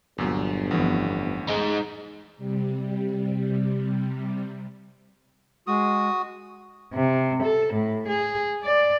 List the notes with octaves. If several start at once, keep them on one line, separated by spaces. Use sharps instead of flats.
G1 E2 A#2 F#3
A1 F2 A2 E3 B3
G#3 D#4
C3 G3
G#3 F#4 D#6
C3
A4
A2
G#4
D5